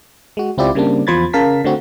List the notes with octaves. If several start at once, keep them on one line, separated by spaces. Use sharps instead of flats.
G#3 F#4
C#2 C4 E4 F4 G4 D5
C#3 G3 A#3 C4 D4
E2 F3 C5 B5 G#6 A6
C#3 A#4 F5 A5 B6
D3 A3 C4 F#4